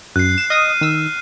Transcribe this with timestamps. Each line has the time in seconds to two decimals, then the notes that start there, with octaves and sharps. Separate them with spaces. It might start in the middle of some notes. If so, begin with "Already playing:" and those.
0.16 F#2 F#6 C7
0.38 E7
0.50 D#5 D#6 F6 D#7
0.81 D#3 E6